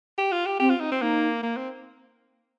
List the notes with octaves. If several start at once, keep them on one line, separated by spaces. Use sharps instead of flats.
G4
F4
G4
C4 G4
F4
D#4
C4
A#3 D#4
A#3
C4